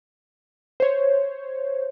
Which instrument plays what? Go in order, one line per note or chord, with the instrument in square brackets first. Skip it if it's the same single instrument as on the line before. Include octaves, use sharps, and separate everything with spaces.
[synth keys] C5 C#5